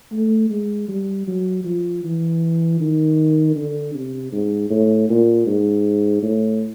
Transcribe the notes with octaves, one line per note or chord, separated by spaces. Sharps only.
A3
G#3
G3
F#3
F3
E3
D#3
D3
C3
G#2
A2
A#2
G#2
A2